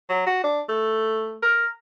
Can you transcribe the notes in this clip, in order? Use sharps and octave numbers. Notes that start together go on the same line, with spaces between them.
F#3
F#4
D4
A3
A#4